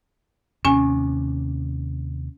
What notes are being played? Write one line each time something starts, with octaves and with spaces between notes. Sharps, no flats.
D#2 C3 C#4 G#5